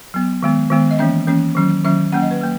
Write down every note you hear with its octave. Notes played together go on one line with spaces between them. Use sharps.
F#3 B3
D#3 G#3 B3
D#3 G#3 B3
D#5
E3 A#3 C#4 E5
E3 A#3 C#4
D#3 F#3 C#4
D#3 F#3 C#4 E5
F#3 A#3 C#4 F#5
D#5
B4
F#3 A#3